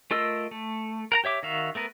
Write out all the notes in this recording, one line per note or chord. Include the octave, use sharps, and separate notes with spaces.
A3 F4 A#4 D#5 E6
A3
A#4 F#5 A#5
G4 C#5 E5 D6
D#3 F#4 E5 F5
A3 B3 A#4 B4